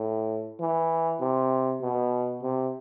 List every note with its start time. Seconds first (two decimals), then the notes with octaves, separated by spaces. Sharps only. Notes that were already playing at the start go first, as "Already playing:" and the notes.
Already playing: A2
0.60 E3
1.21 C3
1.81 B2
2.42 C3